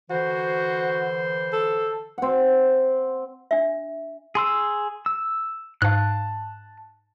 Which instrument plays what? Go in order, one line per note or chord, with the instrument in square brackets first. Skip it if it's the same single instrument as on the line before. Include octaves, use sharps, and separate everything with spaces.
[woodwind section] D3 E3 C5 [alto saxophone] F#4
[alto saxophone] A4
[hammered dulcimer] C4 F#5
[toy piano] D4 E5
[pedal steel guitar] G#4 C6 E6
E6
[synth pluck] G#2 F5 [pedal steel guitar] A5 F#6